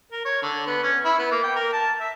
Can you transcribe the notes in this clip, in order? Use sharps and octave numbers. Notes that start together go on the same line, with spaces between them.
A#4
C#5
D3
B3
C#4
E4
B3
A#3
G5
A#4
A5
E5